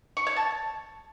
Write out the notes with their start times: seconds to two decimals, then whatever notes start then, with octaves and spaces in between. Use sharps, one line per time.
0.17 C#6
0.27 C#5
0.36 A5